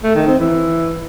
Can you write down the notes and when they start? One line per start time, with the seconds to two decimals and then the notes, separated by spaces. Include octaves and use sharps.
0.03 A3
0.15 D#3
0.27 C4
0.38 E3